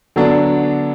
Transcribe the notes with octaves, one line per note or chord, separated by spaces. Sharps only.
D3 F#3 B3 D4